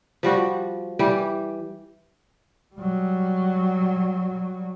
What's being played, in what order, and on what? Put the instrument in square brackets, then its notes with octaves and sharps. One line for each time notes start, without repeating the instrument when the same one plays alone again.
[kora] F3 G3 F#4
E3 G3 G4
[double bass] F#3 G3